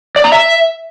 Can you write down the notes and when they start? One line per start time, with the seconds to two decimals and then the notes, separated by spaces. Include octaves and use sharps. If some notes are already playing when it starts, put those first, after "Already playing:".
0.16 D5
0.24 A#5
0.32 E5